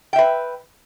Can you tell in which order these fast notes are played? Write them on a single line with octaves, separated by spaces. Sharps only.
G5 E5 B4